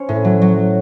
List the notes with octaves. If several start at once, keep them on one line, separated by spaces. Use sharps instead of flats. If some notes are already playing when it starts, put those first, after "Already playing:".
Already playing: C#4 C5
A2
F#3
F#3